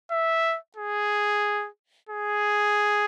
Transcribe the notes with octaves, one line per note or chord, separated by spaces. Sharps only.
E5
G#4
G#4